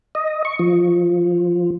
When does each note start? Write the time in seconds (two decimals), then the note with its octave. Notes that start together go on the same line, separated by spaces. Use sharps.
0.15 D#5
0.45 C#6
0.59 F3